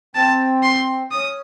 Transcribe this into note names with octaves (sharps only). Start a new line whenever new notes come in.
C4 A5
C6
C#4 D#6